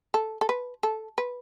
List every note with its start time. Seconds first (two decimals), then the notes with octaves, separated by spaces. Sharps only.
0.14 A4
0.41 A4
0.49 B4
0.83 A4
1.18 B4